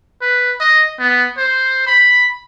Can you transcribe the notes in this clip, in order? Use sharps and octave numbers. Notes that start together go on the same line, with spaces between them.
B4
D#5
B3
C5
B5